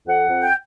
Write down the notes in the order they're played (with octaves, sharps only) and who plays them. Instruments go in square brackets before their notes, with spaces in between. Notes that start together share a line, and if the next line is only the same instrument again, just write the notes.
[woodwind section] F2 F#5
F2
G5